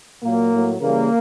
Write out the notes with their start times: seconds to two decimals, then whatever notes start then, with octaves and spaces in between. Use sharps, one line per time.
0.23 A#2 F#3 A#3
0.51 A2 F#3
0.80 C#3 E3 G3 A#3